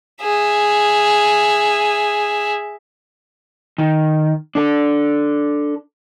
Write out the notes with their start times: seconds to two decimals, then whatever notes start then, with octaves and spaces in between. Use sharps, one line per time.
0.22 G#4 E5
3.78 D#3
4.55 D4 A4